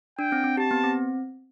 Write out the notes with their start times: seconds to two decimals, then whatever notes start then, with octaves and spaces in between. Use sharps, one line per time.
0.18 D4 G5
0.32 C4
0.44 C4
0.57 G4 A5
0.71 B3
0.84 C4